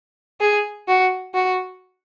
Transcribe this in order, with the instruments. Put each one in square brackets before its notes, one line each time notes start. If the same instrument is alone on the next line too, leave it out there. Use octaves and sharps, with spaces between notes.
[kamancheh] G#4
F#4
F#4